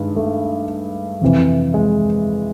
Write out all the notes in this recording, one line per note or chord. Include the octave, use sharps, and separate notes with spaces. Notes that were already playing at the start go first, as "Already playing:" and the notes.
Already playing: G2 D#3 G#3
A3
F2 C3 E3
G#3